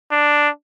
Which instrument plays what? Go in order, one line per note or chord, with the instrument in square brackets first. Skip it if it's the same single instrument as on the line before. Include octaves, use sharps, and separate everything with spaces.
[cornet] D4